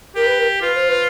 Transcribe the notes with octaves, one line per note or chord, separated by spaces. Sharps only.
G4 A#4
B4
A#4
F4 B4
C5
B4